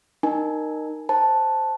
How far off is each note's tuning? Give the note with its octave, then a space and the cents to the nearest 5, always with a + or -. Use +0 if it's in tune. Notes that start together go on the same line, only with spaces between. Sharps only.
D#4 -20 A#4 +0 G#5 +0
C5 +0 A5 +0